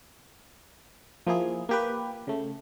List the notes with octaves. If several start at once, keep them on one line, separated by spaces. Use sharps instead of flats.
F3 A#3 E4 G#4
A#3 G4 B4
C#3 A3